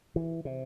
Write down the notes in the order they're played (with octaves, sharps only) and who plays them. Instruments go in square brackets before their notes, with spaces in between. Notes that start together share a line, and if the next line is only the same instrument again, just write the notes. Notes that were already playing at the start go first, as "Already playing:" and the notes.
[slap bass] E3
C3